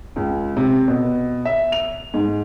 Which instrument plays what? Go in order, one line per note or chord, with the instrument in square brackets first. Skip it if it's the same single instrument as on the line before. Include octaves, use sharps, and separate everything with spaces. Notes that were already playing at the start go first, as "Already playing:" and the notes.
[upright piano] C#2
C3
B2
E5
F7
G#2